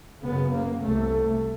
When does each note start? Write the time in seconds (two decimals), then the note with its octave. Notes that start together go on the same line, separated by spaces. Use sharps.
0.22 F#2 C#3 B3
0.53 A#3
0.83 C2 C3 A3